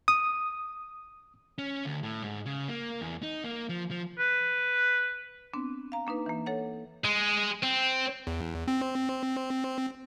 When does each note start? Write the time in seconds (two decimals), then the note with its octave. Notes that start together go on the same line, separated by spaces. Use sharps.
0.08 D#6
1.58 C#4
1.85 D2
2.03 A2
2.23 G#2
2.46 C#3
2.68 A#3
3.01 E2
3.23 D#4
3.44 A#3
3.69 F3
3.91 F3
4.19 B4
5.54 B3 C4 D4
5.92 F5 A#5
6.07 A#3 D4 D#4 B4
6.26 E3 A#3
6.46 A4 C#5 F#5
7.04 G#3
7.63 C4
8.27 E2
8.68 C4